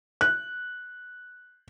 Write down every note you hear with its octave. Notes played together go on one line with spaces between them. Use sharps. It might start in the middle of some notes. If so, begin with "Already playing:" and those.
F#6